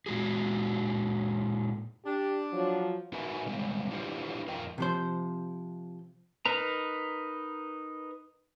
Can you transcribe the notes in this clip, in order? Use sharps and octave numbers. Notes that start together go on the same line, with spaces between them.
A#2 G#3 F#4 G#4
D4 G4
F3 F#3
D#4 F#4 A#4 B4 E5 G#5
C#3 G3 G#3 B3
D4 E4 F4 G4 B4 C5
F2 F4 A#4 D#5 G5
C3 F3 C5
D#4 A#4 B4 A#5